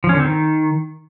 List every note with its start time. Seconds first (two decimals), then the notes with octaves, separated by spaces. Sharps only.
0.04 F3
0.09 C#4
0.14 D3
0.20 C4
0.25 D#3